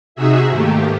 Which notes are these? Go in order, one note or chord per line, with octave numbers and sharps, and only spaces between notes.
C3 D#4 F#4 G#4 E5
G#2 D#3 A3 A#3 G4